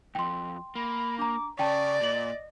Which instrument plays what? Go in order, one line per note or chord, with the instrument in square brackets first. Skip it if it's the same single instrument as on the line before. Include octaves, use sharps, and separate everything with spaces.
[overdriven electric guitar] C2 F2 [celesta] G5 C6
[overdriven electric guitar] A#3 [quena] B5
[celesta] D4 A#5 [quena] D6
[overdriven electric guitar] C#3 [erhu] D5 [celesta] G5 A5 [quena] C#6
[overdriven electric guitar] A#2 [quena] D#5 [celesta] A6 F#7